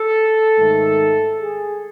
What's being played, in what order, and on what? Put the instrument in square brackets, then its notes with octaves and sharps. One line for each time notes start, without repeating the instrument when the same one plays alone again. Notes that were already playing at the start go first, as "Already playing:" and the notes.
Already playing: [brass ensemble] A4
G#2 D#3 A3
G#4